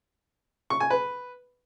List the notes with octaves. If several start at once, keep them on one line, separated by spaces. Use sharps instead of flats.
C#6
G#5
B4